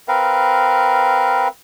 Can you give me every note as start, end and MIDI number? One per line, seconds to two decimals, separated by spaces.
0.08 1.48 60
0.08 1.48 70
0.08 1.48 71
0.08 1.48 77